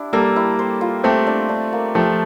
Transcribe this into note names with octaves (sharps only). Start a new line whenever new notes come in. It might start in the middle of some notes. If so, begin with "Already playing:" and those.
Already playing: D4 E4 G4
G3 A#3 A4
E4
C5
F4
A3 C4 G4
D4
D4
A#3
F3 A3 G4